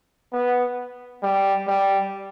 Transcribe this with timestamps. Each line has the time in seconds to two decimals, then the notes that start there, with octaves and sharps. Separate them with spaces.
0.33 B3
1.23 G3
1.67 G3